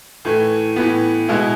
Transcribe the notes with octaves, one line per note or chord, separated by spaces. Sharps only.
A2 E3 A3
A2 E3 B3
B2 G#3 B3 E4